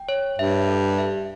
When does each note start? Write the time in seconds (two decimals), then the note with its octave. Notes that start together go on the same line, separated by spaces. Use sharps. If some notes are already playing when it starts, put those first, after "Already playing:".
Already playing: G5
0.09 C#5
0.39 G2 E5
0.68 A4
0.98 E5